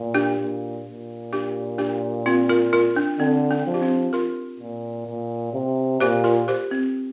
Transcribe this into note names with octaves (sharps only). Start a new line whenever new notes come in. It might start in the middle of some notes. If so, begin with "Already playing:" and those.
Already playing: A#2
D4 G4
A#2
A#2
D4 G4
D4 G4
C4 F4
F4 A#4
F4 A#4
D4
D3 C4
D4
F3
G4
C4 F4
F4 A#4
A#2
A#2
C3
A#2 G4 C5
F4 A#4
G4 C5
C4